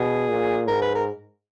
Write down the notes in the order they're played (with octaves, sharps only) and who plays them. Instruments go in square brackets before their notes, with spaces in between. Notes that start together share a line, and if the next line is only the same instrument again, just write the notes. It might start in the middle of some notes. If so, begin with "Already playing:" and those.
Already playing: [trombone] B2 [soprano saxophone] G#4
[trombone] A#2
[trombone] G#2 [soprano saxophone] A#4
[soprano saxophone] B4
A#4